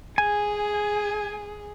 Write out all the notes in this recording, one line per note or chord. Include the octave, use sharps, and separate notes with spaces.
G#4 G#5